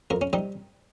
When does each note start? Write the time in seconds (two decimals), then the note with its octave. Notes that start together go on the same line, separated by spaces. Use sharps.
0.10 F2 A#4
0.21 C#4
0.33 C3 G3 D#4